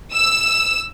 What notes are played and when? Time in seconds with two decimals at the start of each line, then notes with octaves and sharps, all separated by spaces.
0.13 E6